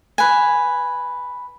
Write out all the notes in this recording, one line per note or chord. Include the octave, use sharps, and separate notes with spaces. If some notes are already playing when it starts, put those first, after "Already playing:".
B4 G#5